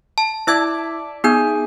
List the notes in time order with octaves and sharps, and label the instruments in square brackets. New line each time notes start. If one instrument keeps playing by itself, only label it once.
[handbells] A5
[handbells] E4 E6 G#6 [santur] D5 E5 A5
[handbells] B3 D#4 G6 [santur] G#4